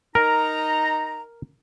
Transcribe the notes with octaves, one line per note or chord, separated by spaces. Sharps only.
D#4 A#4 A#5